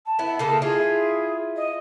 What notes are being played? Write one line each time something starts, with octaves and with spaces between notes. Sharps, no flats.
A5
B3 E4
C#3 A#3 A4
E4 F4 G#4
D#5